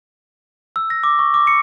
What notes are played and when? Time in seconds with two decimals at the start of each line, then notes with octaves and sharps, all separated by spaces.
0.76 E6
0.90 A#6
1.04 D6
1.19 C#6
1.34 D6
1.47 C#7